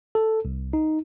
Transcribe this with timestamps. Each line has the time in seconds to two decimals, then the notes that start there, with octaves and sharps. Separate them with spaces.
0.15 A4
0.45 C2
0.73 D#4